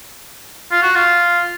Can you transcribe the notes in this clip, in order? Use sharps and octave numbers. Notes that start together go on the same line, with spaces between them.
F4
F#4
F4